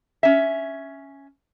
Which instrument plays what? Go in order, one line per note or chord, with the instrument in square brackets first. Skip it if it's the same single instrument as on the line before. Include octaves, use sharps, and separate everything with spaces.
[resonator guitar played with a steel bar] C#4 E5